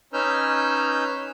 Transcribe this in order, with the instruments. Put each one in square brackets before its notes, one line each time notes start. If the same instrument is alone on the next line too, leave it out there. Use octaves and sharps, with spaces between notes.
[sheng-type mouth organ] C#4 D#4 B4 E6 F6 G6